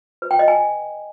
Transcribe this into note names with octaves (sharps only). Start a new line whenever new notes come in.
B4
G5
D#5
G#5